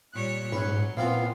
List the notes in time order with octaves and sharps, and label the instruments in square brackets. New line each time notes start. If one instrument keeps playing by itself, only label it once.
[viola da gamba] A#2 G3 C#5 [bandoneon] F#6
[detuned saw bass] G#2 [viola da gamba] F#3 [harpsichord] C#4 B4
[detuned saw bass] A#2 [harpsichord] E3 C4 F4 [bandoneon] B3 F5